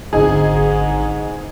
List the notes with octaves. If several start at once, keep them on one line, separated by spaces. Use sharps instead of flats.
G#1 G#2 D3 D#4 G#4